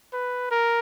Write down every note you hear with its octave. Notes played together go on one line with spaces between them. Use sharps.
B4
A#4